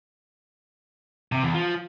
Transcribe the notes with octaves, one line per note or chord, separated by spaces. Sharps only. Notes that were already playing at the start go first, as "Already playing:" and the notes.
C3
E2
F3